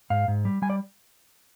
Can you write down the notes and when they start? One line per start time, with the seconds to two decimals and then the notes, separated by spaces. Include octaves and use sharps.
0.10 G#2 F5
0.28 G#2
0.45 G3
0.62 G3 G#5
0.70 D5